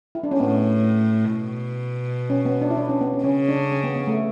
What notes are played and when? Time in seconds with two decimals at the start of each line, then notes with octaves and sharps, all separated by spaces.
0.15 E4
0.23 D4
0.31 C#4
0.40 A2 B3
1.34 B2
2.30 C#4
2.45 B3
2.62 D4
2.70 E4
2.77 D4
2.89 C#4
3.01 B3
3.13 C#4
3.24 C#3 C#4
3.49 D4
3.72 C#4
3.84 B3
3.96 B3
4.07 A3